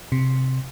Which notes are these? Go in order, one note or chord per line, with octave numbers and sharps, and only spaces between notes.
C3